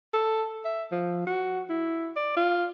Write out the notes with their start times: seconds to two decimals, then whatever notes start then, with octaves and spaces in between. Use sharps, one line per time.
0.14 A4
0.65 E5
0.92 F3
1.27 F#4
1.70 E4
2.16 D5
2.37 F4